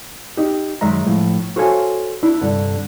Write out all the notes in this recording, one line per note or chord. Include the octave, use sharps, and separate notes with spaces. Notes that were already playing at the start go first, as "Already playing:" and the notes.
D#4 G4
F#2 D#3 G#3 E5 A#5
A2 F3
F#4 A4 C5 C#5 F5 G#5
D4 E4
C2 G2 D3